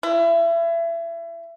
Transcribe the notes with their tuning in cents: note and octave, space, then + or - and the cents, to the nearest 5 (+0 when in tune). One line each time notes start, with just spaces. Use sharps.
E4 +30